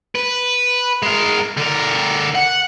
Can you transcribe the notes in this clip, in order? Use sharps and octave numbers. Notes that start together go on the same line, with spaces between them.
B4
G#3 A#4
D3 A#4
F#5